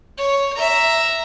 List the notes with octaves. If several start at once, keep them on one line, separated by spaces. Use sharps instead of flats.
C#5
E5 A#5